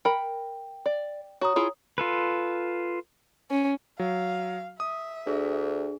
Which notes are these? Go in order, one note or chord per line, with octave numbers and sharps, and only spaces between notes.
A#4 G5 B5
D5
F#4 C#5 A#5 D#6
E4 F4 G#4
F4 A4 B4
C#4
F#3 F5
E5 D#6
D2 D4 G#4